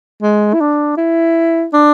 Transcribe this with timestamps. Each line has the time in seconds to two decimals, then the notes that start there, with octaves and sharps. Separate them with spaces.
0.22 G#3
0.54 E4
0.60 D4
0.98 E4
1.73 D4